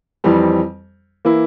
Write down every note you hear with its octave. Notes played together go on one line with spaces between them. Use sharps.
F2 E3 G3 C4
E3 A#3 E4